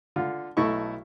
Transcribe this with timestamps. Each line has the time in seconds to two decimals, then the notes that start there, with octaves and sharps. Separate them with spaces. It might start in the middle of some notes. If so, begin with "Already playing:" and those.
0.16 D3 F4
0.57 B1 A3 E4 D#5 C#6